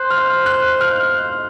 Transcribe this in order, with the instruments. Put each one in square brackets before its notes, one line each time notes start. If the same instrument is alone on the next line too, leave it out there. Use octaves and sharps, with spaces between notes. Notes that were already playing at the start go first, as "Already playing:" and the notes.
Already playing: [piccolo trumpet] C5 [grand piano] F#6
[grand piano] F6
F#6
F6